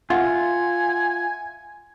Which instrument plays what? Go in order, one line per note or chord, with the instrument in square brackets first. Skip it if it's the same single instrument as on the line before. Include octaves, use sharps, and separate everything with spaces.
[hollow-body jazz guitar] F4 [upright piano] E5 F#5 [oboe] G#5